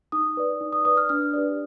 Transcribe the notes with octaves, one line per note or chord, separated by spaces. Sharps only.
D#4 D#6
B4 D5
D#4
D#6
B4 D5 D#6
F6
D4 F6
G4 B4 D5